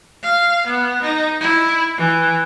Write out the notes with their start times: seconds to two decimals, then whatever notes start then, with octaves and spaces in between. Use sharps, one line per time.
0.23 F5
0.67 B3
1.02 D#4
1.40 E4
1.98 E3